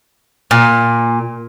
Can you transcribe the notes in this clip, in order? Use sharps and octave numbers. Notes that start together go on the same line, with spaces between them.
A#2